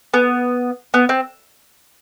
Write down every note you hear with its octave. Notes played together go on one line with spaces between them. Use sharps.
B3
B3
C4